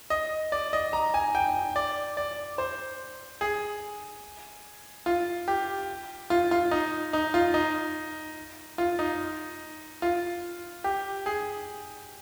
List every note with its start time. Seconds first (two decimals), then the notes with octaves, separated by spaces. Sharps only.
0.10 D#5
0.52 D5
0.73 D#5
0.93 A#5
1.14 G#5
1.35 G5
1.76 D5
2.17 D5
2.58 C5
3.41 G#4
5.06 F4
5.48 G4
6.30 F4
6.51 F4
6.71 D#4
7.13 D#4
7.34 F4
7.54 D#4
8.78 F4
8.99 D#4
10.02 F4
10.84 G4
11.26 G#4